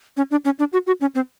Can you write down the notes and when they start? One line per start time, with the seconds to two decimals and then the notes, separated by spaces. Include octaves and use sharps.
0.17 C#4
0.31 D4
0.45 C#4
0.59 D4
0.73 F#4
0.87 F#4
1.01 C#4
1.15 C4